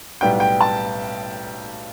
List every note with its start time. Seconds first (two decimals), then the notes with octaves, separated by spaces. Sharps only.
0.21 B1 A2 G3 B3 G5
0.40 G5
0.61 A5